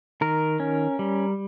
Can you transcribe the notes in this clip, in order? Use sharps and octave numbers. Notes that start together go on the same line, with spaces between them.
D#3 A#4
C#4
G3